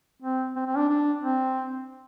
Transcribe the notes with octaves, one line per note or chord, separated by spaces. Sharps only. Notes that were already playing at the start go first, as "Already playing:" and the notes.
C4
C4
C4
D4
D4
C4